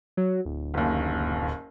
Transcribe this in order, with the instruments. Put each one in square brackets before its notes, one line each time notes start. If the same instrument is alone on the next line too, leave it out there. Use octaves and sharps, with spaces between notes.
[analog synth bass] F#3
D1
[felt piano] F#1 D#2